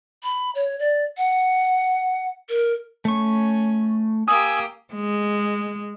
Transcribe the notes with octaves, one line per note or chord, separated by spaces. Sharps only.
B5
C#5
D5
F#5
A#4
A3 C#4 C#6
A#3 G4 G#5 D#6 E6
G#3